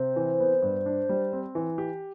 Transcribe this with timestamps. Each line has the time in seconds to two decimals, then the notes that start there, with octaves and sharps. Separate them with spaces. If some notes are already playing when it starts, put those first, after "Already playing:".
Already playing: C3 C4 C5
0.16 E3
0.40 B3
0.62 G2
0.86 D4
1.09 G3
1.33 C4
1.55 E3
1.78 G4